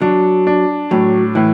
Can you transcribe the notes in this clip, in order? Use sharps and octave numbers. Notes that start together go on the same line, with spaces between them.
F#3 D4
D4
A2 F#3
A2 E3